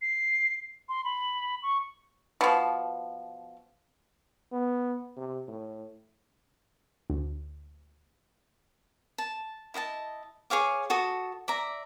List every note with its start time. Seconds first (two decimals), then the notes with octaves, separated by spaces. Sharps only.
0.02 C7
0.89 C6
1.04 B5
1.63 C#6
2.41 B2 F3
4.52 B3
5.17 C3
5.48 A2
7.10 D2
9.18 A5
9.74 E4 D#5 F5 A5
10.50 G#4 C#5 F5 D6
10.90 F#4 A4 A5 D#6
11.48 D5 E5 A#5